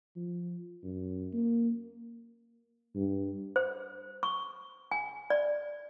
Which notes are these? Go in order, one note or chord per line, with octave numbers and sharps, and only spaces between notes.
F3
F#2
A#3
G2
C5
C#6
G#5
D5